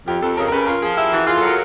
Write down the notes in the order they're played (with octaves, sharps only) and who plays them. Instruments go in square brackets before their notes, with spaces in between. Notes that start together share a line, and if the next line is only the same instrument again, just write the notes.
[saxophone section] F2 [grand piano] G4
[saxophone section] F2 [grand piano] A4
[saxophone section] C#3 [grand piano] A#4
[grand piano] A#4
[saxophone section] C#3 [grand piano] B4
[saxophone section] F4 [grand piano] A#4
[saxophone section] F3 [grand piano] G#4
[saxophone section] E4 [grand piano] G4
[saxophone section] E3 [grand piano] F#4
[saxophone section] F4 [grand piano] G#4
[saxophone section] F#3 [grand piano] A4
[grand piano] A#4